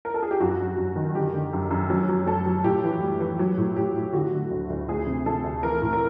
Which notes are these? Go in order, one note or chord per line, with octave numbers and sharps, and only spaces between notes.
A#4
A4
G#4
G4
F#2 F#4
F#2
F#2
D#3
D3 G4
D3
F#2
F#2
F#3
F#3
F#3 A4
F#3
A2 G4
E3
G3
E3
F#3
A2
A2 G4
A2
D3 F#4
D3
D2
D2
D2 G#4
C3
C3 A4
D2
E3 A#4
A2
A#4